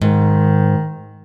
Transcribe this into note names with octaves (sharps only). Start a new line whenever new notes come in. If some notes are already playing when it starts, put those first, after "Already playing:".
G#2 D#3